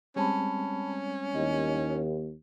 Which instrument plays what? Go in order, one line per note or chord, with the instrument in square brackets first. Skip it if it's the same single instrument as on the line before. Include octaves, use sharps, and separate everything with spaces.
[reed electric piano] G3 G#3 C4 [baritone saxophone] C#4 [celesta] C#5 A5 B5
[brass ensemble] D#2 [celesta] E4 C#5 D#5